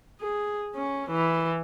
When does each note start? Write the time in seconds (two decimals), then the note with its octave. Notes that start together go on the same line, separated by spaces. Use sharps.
0.21 G#4
0.76 C#4
1.11 E3